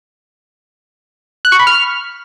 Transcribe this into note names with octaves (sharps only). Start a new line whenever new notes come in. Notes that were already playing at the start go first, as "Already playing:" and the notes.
F#6
C#6
B5
F6